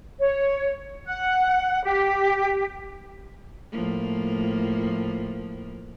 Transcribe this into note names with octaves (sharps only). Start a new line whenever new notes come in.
C#5
F#5
G4
A2 F3 A#3